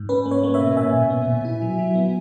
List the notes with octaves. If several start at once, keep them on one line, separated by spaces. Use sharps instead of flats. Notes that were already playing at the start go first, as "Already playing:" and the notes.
Already playing: G#2
C#4 B4
A#3
C#5
A#3
C#5 E5
B2
A#2 E5 G#5
A#2
B3
A#2
E4
F#3
F#3
B3